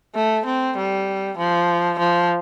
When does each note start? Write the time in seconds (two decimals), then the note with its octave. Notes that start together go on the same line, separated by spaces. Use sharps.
0.15 A3
0.46 C4
0.76 G3
1.38 F3
1.99 F3